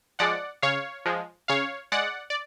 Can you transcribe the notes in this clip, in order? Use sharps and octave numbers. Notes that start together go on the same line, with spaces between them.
F3 G#3 D5 F#5
C#3 C#5 F5
F3 G#3
C#3 C#5 F5
G#3 D5 F#5
D5